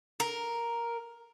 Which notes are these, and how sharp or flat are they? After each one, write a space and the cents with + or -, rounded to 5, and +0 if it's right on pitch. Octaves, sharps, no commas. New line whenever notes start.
A#4 +5